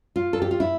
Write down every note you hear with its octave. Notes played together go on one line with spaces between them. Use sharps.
F4
A4
G4
F4
E4